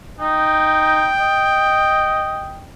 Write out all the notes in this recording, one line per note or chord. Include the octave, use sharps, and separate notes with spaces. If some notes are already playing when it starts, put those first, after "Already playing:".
D#4 G5
D#5